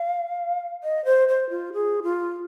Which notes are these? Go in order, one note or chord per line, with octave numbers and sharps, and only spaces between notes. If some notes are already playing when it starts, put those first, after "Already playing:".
Already playing: F5
D#5
C5
C5
F4
G#4
F4